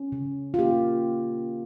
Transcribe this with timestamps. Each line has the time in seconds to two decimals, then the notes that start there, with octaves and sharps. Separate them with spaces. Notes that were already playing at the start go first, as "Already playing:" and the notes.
Already playing: C#4
0.12 C#3
0.54 F4
0.59 A#3 G4